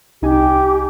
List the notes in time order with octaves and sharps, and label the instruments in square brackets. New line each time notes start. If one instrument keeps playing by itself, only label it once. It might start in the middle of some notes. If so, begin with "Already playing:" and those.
[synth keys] C2 D#4 G#5 [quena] G4